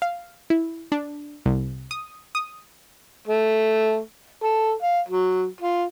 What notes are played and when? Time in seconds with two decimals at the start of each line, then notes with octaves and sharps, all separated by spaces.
0.02 F5
0.50 E4
0.92 D4
1.46 C2
1.91 D#6
2.35 D#6
3.28 A3
4.43 A4
4.82 F5
5.08 F#3
5.61 F4